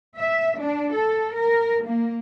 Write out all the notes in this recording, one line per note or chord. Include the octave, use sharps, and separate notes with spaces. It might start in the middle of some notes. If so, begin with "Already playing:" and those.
E5
D4
A4
A#4
A#3